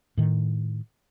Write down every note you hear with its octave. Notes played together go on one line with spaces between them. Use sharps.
A2 D#3